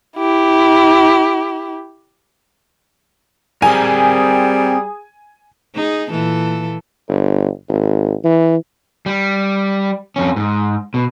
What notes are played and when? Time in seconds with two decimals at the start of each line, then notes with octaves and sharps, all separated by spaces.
0.17 E4 G4
3.62 G3 C4 G#4 A#4 G#5
5.75 D#4 G#4
6.10 A#2 E3 A4
7.09 G1
7.69 G#1
8.24 E3
9.06 G3
10.16 F2 C#4
10.36 G#2
10.94 B2